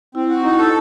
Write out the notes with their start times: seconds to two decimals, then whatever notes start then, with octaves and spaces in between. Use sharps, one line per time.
0.15 C4 E4
0.29 F#4
0.43 D#4
0.58 A4